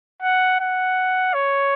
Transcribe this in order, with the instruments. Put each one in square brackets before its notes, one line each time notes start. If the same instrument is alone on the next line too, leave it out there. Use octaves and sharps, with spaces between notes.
[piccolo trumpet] F#5
F#5
C#5